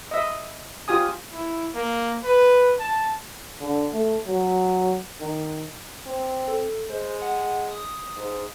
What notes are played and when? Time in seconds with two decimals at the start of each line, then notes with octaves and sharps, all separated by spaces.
0.11 D#5 E5
0.88 F4 G4 G#5 D#6
1.33 E4
1.75 A#3
2.24 B4
2.79 A5
3.61 D3
3.93 A3
4.27 F#3
5.21 D#3
6.06 C4
6.48 A4
6.90 G#3 C5
7.22 F#5
7.71 D#6
8.17 G#2